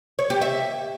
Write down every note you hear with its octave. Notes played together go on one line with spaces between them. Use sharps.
C#5
G4
E5